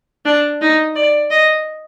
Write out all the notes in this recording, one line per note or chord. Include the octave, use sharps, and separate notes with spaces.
D4
D#4
D5
D#5